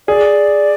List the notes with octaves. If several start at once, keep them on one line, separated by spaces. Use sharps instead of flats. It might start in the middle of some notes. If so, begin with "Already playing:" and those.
G#4 D5